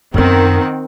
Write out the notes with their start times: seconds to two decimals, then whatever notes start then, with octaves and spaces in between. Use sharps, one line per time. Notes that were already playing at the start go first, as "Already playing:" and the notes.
0.14 F#2 D#3 B3 C4 F#5